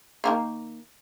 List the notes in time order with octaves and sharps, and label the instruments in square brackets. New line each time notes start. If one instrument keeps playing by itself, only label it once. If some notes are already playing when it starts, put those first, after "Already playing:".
[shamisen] D#3 A#3 F5